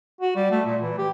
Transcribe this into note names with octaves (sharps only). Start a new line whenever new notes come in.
F#4
G3
A3
A#2
E3
G4